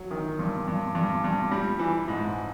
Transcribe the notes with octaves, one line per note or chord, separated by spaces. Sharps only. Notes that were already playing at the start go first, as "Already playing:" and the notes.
Already playing: F#3
D#3
G2
G2
G2
G2
G3
E3
G#2